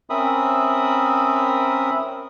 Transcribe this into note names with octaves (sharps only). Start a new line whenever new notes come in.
C4 C#4 A#4 E5 B5 D#6